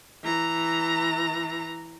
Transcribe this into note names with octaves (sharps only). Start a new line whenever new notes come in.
E3 A#5